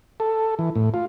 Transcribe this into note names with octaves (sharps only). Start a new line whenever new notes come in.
A4
E3
A2
F4